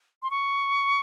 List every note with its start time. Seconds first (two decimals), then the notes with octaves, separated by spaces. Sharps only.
0.23 C6
0.31 C#6